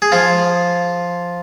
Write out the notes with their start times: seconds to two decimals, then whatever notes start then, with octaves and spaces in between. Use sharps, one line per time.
0.02 G#4
0.12 F3 F4